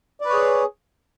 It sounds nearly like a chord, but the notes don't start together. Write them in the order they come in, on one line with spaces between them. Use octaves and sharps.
D5 B4 C#5 G#4